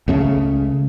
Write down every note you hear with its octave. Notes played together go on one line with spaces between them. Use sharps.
C#2 C#3 G#3 A3